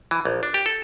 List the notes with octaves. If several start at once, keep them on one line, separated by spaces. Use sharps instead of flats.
E3
A#1
D4
G4
A4